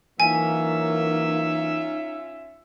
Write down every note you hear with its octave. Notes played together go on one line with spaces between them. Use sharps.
E3 F#3 A#3 C#4 D#4 F4 E5 G#5